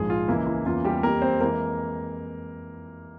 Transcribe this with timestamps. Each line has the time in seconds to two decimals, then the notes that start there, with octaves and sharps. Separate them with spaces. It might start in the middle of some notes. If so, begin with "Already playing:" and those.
Already playing: A#1 G#2 F3 G#3 G#4
0.10 F4
0.28 C#2 C#3 E3 A#3 E4
0.47 E4
0.66 E2 C#3 E3 A#3 F4
0.84 G3 G4
1.03 F2 E3 G3 A#3 A#4
1.22 C4 C5
1.41 F2 E3 G#3 A#3 A#4